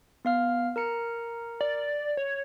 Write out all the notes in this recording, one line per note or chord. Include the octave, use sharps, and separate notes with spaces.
B3 F5 F6
A#4 A#5 C#7
D5
C#5